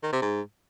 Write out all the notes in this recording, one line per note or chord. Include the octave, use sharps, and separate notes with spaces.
D#3
C3
G#2